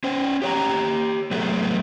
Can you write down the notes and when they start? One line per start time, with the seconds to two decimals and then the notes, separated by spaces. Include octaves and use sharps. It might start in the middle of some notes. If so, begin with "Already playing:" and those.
0.04 C#4 C5
0.42 G4 C#5 A#5
1.31 F#3 A3 B3 G#4 C#5